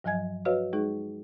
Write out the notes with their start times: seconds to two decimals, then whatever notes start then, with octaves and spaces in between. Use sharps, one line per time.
0.04 G2 F3 F#3 D#5 G#5 G#6
0.45 F#4 B4 C#5 D#5 F5 F6
0.73 G#3 D#4 G#4